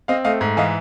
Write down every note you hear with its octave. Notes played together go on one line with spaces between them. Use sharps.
C4 D#5 F5
A3 D#5 F5
G#2
E3 D#5 F5